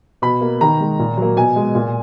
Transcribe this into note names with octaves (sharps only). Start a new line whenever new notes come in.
B2 B5
A#3
D#3 A#5
G#3
A#2
F#3 A#3
B2 G#5
G#3
A#2